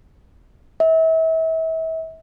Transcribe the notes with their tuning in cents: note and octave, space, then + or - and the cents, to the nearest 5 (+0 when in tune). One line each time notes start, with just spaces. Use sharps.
E5 -35